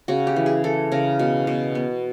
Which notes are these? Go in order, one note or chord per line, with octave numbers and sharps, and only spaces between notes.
C#3 F#4
G4
E3
G#4
E3 A4
C#3 A#4
B2
B2
B3